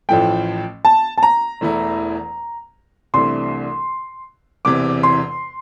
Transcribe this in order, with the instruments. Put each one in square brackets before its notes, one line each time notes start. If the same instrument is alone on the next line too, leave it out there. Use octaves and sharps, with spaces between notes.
[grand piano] A1 A2 F3 A3 [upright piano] G5
[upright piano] A5
A5
A#5
[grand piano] E1 E2 E3 A3 E4
[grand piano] C2 C3 E3 A3 D4 [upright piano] C6
[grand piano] E1 E2 C3 E3 [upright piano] D6
[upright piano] C6